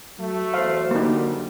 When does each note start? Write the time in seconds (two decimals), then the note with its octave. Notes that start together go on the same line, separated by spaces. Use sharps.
0.19 F#3 A3
0.54 E2 C5 F5
0.91 D3 G3 A#3 D#4